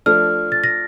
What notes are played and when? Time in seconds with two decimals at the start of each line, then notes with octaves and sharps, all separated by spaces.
0.06 F3 A3 D4 F6
0.52 A6
0.64 A#6